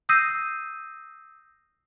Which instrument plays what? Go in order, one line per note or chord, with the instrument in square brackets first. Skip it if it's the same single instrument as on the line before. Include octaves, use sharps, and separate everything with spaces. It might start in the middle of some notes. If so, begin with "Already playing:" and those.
[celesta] D#6 E6 G6 A#6 C7 D#7